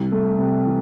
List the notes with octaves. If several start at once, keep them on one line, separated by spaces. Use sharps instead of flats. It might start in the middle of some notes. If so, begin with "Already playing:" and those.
Already playing: C2
A3
C3
E3